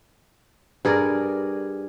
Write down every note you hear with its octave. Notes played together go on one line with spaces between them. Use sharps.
G2 G#4 A#4 D5